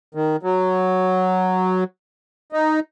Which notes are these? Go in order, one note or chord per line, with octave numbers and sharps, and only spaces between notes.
D#3
F#3
D#4